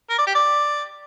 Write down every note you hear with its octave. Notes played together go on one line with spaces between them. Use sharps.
A#4
D5
G4
D5